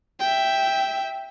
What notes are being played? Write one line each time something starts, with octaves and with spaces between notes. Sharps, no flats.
E5 G5